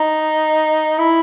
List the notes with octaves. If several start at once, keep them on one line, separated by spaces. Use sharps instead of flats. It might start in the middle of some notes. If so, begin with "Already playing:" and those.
Already playing: D#4
E4